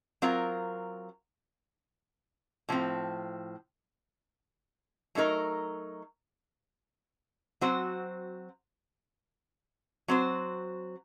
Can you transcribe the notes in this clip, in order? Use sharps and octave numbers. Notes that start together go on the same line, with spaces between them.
F#3 C4 F4 A#4
A2 F3 C4
F#3 A3 D#4 A#4
F#3 C4 F#4 C5
F#3 C4 F#4 C5